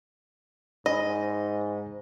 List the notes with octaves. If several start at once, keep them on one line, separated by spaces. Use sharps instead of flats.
G#2 C5 D#5 G#5 B5